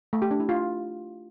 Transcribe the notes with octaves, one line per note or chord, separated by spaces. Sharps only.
A3
G4
D4
E4
F4